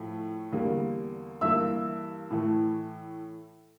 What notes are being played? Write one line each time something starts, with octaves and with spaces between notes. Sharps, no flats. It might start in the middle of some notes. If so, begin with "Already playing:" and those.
Already playing: A2 F3 A3
E2 D3 G3 A#3
G2 E3 A#3 E5 E6
A2 E3 A3